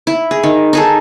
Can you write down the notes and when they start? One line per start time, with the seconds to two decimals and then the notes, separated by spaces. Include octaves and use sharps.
0.07 E4
0.31 G#4
0.43 D#3
0.73 D#4 G#4 A4